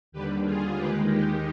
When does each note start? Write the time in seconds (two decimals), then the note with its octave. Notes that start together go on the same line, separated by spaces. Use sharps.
0.12 D#2 D3 G3 G4 B4
0.44 F4 G#4
0.76 D#2 D#3 G#3 G4 B4
1.08 D#4 G4